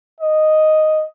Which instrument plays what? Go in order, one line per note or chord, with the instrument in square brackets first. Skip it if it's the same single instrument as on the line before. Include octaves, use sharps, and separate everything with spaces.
[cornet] D#5